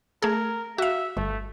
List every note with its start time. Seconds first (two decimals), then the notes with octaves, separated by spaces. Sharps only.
0.22 A3 G#4 A#4
0.78 F#4 E5 F5
1.17 G1 A3